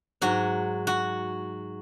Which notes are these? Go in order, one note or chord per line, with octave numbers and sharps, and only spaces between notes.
G#2 F#3 F#4
F#4